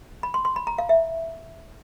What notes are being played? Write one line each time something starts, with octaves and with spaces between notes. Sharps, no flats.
B5
C6
C6
B5
A#5
F5
E5